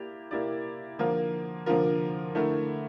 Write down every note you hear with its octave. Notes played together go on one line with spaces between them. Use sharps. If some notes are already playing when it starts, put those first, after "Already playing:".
Already playing: A#3 E4 G4 D5
A#3 E4 G4 D5
D3 F3 A#3 F4 A#4
D3 F3 A#3 F4 A#4
D3 A3 E4 A#4